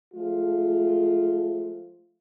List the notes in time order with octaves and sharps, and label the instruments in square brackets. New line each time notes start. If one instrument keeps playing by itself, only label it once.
[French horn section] F3 G#3 A3 F4